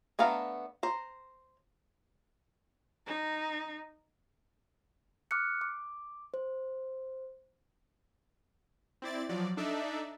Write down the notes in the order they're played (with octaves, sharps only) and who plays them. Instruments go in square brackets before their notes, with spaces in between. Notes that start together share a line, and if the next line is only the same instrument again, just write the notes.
[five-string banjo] A3 B3 D4 F5 A#5
C5 A#5
[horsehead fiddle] D#4
[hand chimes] D6 F6 F#6 C#7
D6
C5
[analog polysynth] C4 E4 D5 A6
F3 F#3 D5
D4 D#4 A4 D5 E5